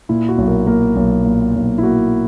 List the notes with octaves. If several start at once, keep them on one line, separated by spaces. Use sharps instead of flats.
A#2 E4
F#4
B1
A#4
A#3 A#4
B1
A#2
B1
E4
A#3 F#4